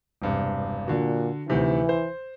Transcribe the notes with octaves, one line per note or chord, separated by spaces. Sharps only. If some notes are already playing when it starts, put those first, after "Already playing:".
E1 G2 C3
A#2 D3 F#4
D2 C3 D#3 E3
C5